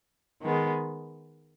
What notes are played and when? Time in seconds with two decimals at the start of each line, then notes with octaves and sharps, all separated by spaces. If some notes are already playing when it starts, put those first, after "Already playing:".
0.41 D#3 G#3 B3